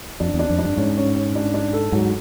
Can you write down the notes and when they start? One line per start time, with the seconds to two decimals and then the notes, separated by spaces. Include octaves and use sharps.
0.20 F2 D4
0.34 E2
0.39 D4
0.50 F2
0.59 D4
0.64 G2
0.77 G#2 C#4
0.97 C#4
1.15 C#4
1.35 D4
1.54 D4
1.73 A4
1.92 G#2 F#3